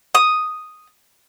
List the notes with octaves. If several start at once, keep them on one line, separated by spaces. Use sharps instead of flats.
D#6